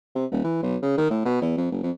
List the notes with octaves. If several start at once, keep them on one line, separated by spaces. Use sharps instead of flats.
C3
D#1
E3
B1
C#3
D#3
A2
B2
E2
F2
F#1
F2